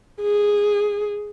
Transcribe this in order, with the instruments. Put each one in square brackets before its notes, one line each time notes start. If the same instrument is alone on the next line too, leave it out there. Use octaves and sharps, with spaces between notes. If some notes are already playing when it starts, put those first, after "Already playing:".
[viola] G#4